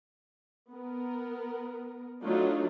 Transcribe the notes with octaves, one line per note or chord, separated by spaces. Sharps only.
B3 A#4
F#3 A3 D4 D#4 F4 F#4